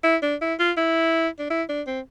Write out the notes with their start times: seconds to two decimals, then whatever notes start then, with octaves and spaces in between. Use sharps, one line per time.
0.04 E4
0.22 D4
0.41 E4
0.59 F4
0.77 E4
1.39 D4
1.50 E4
1.69 D4
1.87 C4